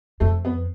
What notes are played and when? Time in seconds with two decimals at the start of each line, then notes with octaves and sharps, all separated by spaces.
0.20 F2 A3
0.45 B3